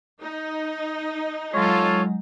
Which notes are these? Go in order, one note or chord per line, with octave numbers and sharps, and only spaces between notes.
D#4
F#3 G#3 F4 A4 C#5